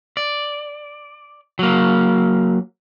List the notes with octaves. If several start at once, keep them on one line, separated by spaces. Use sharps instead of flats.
D5
F#3 A#3